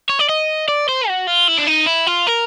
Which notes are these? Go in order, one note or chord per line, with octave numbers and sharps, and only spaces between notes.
C#5
D5
D#5
D5
C5
F#4
F4
E4
D4
D#4
E4
F4
A#4